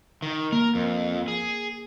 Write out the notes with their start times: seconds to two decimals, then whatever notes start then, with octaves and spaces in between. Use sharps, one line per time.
0.22 D#3
0.52 A#3 A#4
0.75 F2
1.28 G#4